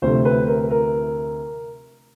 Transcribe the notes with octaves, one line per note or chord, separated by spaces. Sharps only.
D2 C3 F3 A3 C5
B4
A#4
A#4